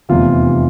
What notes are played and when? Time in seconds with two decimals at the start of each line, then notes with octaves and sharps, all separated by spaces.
0.09 F1 E2 C3 E3 F4